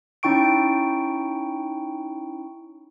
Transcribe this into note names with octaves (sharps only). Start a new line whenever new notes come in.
C#4 D#4 E4 G5 C#6 D7